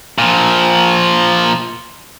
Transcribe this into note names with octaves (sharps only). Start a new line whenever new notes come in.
A#2 F3